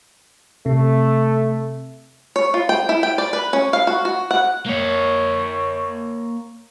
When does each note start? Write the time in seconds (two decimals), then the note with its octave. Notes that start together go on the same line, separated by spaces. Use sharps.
0.66 C3 A3
2.36 C#5
2.54 F4
2.69 G5
2.89 E4
3.03 G5
3.18 D5
3.33 B4
3.53 C#4
3.73 F5
3.87 F#4
4.05 F#4
4.31 F#5
4.67 A#3 C#5